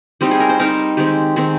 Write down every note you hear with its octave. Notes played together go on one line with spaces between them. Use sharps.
G3 C4 D#4 G4
G#4
A#4
C5
G3 C4 D#4 A#4
D#3 G#3 C4 G4
D#3 G#3 C4